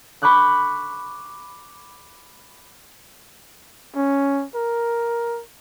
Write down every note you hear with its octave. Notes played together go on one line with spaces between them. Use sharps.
B5 C#6 D6 F#6 G6
C#4
A#4